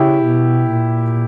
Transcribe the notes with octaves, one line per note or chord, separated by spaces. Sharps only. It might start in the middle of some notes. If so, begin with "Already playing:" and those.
Already playing: C#3 E4 G4
B2
A#2